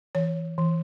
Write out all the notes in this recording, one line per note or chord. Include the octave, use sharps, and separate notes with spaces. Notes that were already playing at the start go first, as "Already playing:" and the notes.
E3 C#5
E3